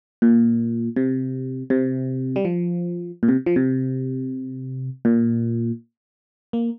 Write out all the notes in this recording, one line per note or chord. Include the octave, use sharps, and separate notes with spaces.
A#2
C3
C3
G3
F3
A#2
C3
F3
C3
A#2
A#3